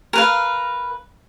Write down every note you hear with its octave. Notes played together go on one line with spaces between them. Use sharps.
A#4 B4 F5